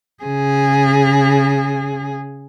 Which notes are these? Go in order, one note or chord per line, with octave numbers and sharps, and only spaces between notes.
C#3 G#4